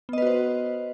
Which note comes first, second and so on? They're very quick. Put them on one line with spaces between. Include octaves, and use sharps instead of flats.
B3 D#5 B4 F#4 C5